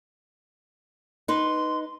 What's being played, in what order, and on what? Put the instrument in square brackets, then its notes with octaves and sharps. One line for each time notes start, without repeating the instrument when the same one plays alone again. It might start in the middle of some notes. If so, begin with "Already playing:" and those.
[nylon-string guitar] D#4 B4 [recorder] C6